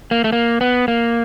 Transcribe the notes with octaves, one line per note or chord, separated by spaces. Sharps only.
A#3
A3
A#3
B3
A#3